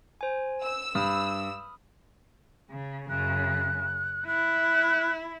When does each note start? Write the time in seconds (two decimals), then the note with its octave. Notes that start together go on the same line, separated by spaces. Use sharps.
0.21 C5 G#5
0.63 E6
0.95 G2 B5 D#6 F6
2.70 C#3
3.09 F#2 C#3 F#6
4.27 E4 F#6